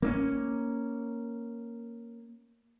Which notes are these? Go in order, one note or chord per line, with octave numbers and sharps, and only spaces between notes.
A#3 C4 C#4